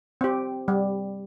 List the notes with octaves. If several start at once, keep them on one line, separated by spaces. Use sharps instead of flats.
C4 G4
G3